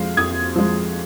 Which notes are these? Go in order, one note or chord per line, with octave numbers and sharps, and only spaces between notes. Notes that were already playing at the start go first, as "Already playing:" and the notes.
Already playing: F2 F3 G#3 F5
F2 D#6 G#6
F3 G#3